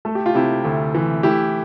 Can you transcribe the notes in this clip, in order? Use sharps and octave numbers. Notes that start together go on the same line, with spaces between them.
A3 A4
G4
F4
C3 E4 G4
D2
E3
A3 E4 G4